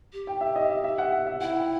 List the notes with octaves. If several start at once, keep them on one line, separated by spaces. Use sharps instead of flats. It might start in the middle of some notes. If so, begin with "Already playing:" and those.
G4
G5
E5
D#5
E5
E5
F#5
E5
E5
E4 F#5
G5